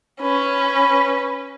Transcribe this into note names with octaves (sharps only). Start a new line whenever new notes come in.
C#4 B4